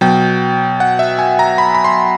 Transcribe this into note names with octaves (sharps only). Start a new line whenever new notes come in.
B2 F#3 G5
F#5
E5
G#5
A#5
B5
B5
C6